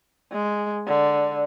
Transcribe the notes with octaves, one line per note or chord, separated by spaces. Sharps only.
G#3
D3